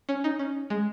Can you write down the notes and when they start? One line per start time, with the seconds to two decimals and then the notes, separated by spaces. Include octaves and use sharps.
0.09 C#4
0.24 D#4
0.39 C#4
0.70 G#3